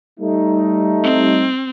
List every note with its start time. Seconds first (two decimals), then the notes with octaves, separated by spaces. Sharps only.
0.20 G3 A3 D#4
1.04 C4